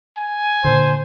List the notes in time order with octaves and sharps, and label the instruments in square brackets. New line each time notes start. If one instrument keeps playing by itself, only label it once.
[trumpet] G#5
[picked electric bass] A#2 D3 [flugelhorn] C5